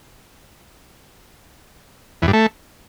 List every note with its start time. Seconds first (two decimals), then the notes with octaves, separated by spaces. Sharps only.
2.22 E2
2.28 G2
2.33 A3